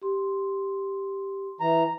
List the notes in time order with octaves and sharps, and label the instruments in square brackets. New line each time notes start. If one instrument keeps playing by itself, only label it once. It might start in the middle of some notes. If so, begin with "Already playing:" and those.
[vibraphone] G4 C6
[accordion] E3 A#5